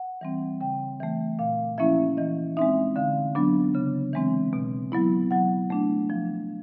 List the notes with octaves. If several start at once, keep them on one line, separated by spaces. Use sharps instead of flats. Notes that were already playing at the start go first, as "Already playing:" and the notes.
Already playing: F#5
E3 G3 C4
C#3 G5
E3 A3
A#2 F5
F3 A#3 C#4 E4 E5
E3 D#5
G#3 C4 D#4 E5
D3 F5
F#3 B3 D4
C#3
E3 G#3 C4
B2
F#3 B3 E4
F#3 F#5
A3 D4
F3